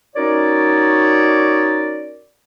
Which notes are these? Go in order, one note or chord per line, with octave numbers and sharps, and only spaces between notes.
C#4 D#4 F#4 A#4 C#5 D5